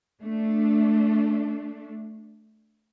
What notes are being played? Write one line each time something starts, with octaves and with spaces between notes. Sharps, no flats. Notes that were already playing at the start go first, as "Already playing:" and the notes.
A3 D4